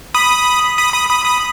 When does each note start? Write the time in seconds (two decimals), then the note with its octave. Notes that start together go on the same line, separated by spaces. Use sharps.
0.14 B5 D#6
0.78 B5 D#6
0.93 B5 D#6
1.10 B5 D#6
1.25 B5 D#6